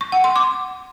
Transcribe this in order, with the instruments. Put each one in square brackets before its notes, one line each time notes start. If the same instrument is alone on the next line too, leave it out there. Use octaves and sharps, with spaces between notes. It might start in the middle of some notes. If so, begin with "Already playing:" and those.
[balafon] C#6
F#5
C6
D6